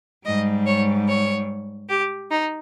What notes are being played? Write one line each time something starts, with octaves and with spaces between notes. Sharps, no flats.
G#2 G3 D#5
C#5
C#5
G4
D#4